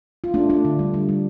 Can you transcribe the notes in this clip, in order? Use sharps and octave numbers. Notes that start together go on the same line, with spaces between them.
F4
A3 D4
A3 D4
D3
G3
G3
G3